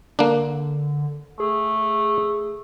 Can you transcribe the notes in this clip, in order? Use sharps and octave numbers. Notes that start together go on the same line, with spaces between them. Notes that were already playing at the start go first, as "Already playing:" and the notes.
D3 A#3 D4
A3 G#4